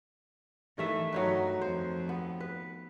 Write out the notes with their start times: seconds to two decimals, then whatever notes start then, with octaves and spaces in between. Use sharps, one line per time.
0.78 D#3 E3 A3 E5
1.12 G2 F#3 D#4 F#4 B4
1.61 F2 C5
2.09 B3
2.40 B4